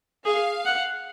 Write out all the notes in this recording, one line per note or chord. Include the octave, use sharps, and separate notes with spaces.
G#4 F5
F#5